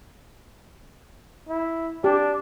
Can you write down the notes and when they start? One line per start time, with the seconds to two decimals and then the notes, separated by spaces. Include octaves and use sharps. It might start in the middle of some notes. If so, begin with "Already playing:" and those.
1.48 E4
2.04 D4 G4